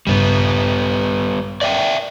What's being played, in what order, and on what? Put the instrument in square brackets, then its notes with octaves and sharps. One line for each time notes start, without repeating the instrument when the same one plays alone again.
[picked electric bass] A#1 G2 C#3 [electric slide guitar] G3 B3
[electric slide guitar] D5 E5 G5